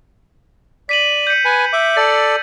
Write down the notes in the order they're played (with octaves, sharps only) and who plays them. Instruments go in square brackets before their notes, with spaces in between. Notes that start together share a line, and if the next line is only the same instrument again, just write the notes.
[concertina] D5 [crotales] B6 D#7 F#7
[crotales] G6 C#7
[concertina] B4 G#5
E5 D6
[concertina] A4 D5 [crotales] A6